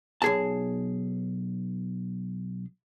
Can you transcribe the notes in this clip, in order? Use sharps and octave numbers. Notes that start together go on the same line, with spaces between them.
B1 G#4 A5